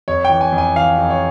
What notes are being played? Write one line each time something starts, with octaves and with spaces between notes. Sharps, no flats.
F2 C#5
E3 G5
G#5
F2
G#5
E3 F5
F2
C#5